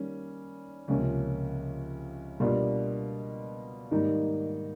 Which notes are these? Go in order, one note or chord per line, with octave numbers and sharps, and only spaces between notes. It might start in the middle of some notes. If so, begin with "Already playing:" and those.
Already playing: D#3 G3 A#3 C#4
C#2 C3 F3 A#3 C#4
B2 G3 A#3 D4 F4
G#2 D#3 G3 A#3 D#4